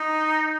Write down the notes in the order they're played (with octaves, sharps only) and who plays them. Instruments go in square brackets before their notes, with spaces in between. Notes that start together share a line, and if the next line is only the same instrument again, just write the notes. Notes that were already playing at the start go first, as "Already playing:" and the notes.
Already playing: [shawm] D#4